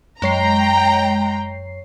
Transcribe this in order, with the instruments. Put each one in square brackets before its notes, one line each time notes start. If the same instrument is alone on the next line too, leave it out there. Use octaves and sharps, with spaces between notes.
[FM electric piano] F#2 C#5 C7 [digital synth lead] G#3 [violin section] G5 A#5